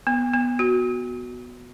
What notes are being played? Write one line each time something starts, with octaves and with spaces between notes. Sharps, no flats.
B3
B3
F#4